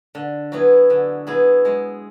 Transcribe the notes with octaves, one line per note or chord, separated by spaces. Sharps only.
D3
F#3 B3 E4 G#4
D3
F#3 B3 E4 G#4
G#3